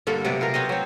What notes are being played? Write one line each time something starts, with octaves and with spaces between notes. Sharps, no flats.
G2 D3 A#3 A4
C3 F#3 B3 D5
F4 A#4
B3 C4 C#5 D#5
F#3 C4